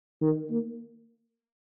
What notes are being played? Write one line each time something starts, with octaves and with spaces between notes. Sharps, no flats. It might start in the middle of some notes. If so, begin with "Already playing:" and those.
D#3
A#3